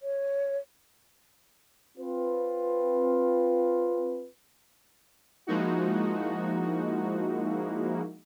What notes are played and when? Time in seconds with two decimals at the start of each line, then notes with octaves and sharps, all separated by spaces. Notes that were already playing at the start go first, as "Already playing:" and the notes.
0.01 C#5
1.98 C4 F4 B4
5.47 F3 G#3 A#3 D#4 E4 F#4